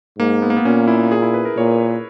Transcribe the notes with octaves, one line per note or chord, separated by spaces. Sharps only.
G#2 A#3
B3
A#3
B3
A#2 C#4
E4
G#4
E4
B4
A#4
A#2 C#5